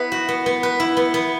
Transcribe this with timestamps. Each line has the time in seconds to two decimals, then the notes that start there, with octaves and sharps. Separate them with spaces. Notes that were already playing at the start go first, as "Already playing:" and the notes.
Already playing: B3 E4 B4
0.12 F#4
0.29 B3
0.46 B3
0.63 B4
0.80 E4
0.97 B3
1.14 B3